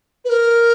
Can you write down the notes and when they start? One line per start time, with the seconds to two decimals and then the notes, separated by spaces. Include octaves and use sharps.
0.24 B4
0.29 A#4